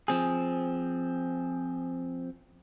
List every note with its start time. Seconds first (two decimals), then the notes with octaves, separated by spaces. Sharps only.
0.08 F3 C4 G#4